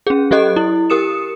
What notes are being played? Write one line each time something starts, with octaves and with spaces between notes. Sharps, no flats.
C#4 G#4
F#3 G4 A4 D#5 F#6
E4
G4 A#4 D#6 C#7 E7